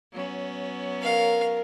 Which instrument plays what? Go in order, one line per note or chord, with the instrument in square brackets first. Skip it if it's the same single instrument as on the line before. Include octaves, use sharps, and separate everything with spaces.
[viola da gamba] F#3 B3 C#4
[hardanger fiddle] A#4 [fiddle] F5